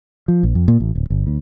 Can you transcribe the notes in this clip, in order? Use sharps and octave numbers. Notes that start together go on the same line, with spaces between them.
F3
A#1
F2
A#2
A1
D1
G1
D2